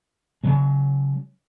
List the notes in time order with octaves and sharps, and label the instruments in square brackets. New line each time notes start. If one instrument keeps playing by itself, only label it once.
[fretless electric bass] C#3 F#3 G#3